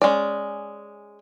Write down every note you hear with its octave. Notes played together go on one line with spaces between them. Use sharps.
G#3 C#4 D5